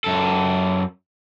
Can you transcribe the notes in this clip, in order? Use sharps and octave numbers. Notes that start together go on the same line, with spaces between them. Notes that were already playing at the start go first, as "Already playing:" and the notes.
F#2 A4